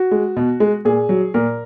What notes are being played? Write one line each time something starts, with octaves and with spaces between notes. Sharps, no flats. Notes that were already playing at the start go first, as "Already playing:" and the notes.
Already playing: F#4
G#3
B2
G#3
A#2 G#4
F#3
A#2 A#4